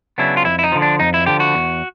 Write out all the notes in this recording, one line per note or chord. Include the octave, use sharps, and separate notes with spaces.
C#3 F#3 B3 D4 E4
F4
F2 E4
E4
D#4
D3 F3
D4
F2 D#4
E4
D3 F3 G4
F#4
E2